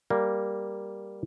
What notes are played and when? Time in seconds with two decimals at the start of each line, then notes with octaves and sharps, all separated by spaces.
0.10 G3 A#3